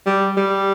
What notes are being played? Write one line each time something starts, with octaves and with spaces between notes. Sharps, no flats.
G3
G3